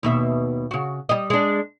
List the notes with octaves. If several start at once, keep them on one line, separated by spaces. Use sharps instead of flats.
D#2 B2 E5
C#3 F#4
G3 D#5
G#3 D4